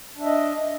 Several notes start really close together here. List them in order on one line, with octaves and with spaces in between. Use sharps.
D4 E5 D#5